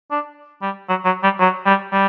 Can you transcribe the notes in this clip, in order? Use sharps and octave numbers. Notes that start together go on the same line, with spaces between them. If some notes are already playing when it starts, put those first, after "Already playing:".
D4
G3
F#3
F#3
G3
F#3
G3
G3